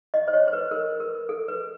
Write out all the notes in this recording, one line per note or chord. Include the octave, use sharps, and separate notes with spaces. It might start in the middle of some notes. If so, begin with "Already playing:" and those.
D#5
C5
C#5
C5
B4
A#4
A#4
A4
B4